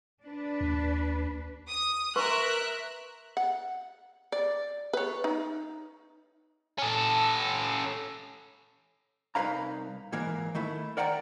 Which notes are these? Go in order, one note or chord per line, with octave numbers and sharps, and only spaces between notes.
D4 B4
D#2
D#6
A#4 B4 E5 C6 C#6 F#6
F#5
D5
B4 C#5
D#4
C#4 A4
C2 D#3 D#4 B4 F5 A#5
G#2 E3 A#3
D#3 A3 E4
A#4 D5 F#5 G5 A5 A#5